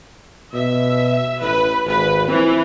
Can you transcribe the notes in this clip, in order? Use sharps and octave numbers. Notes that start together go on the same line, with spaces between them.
B2 E5
A1 B4
G#1 B4
E3 C4